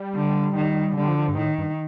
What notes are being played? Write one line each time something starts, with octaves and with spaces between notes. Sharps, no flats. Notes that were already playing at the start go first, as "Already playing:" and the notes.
Already playing: G3
D3
D#3
D3 G3
F3
F3
G2
A2 D#3
G2